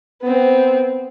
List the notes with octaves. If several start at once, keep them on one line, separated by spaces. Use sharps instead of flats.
B3 C4